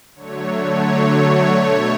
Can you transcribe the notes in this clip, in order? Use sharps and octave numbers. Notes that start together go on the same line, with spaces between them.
D3 F#3 A3 C#5
C#5
D3 F#3 A3 C#5
B2 A3 C#5